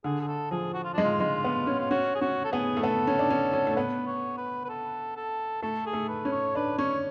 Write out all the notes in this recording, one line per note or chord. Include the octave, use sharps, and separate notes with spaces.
D3 G#4
G#4
A4
F3 G#4
F#4
F4
G#3 D4
F4
G#3
B3
C#4
F4
C#4 F#4
G#4
C#4 F#4
A4
B3 G#4
A3
B3 A4
C#4
D4
C#4
C#4
A3
B3 B4
C#5
B4
B4
A4
A4
A3 A4
G#4
A3
B4
C#4
C#5
D4 B4
C#4 C#5